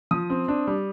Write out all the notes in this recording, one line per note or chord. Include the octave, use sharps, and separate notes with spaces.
F3 D#6
C4
D4
G3